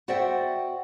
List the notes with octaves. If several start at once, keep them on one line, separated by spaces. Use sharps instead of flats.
F#4 C5 D5 E5 F#5 G5